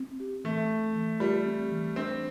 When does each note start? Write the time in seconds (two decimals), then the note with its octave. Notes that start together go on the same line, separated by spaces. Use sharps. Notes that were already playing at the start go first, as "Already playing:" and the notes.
Already playing: C4
0.20 G4
0.44 E3 A3
0.69 C4
0.96 E3
1.20 G3 F4
1.45 C4
1.71 E3
1.96 C4 D4